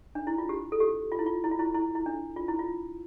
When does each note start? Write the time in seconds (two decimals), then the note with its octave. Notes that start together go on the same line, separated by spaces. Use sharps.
0.15 D4
0.27 E4
0.38 F4
0.49 G4
0.72 A4
0.80 G4
1.12 F4
1.19 E4
1.26 F4
1.44 E4
1.51 F4
1.59 E4
1.74 E4
1.95 E4
2.06 D4
2.36 F4
2.48 E4
2.59 F4